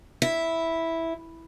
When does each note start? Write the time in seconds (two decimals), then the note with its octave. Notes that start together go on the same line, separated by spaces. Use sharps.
0.22 E4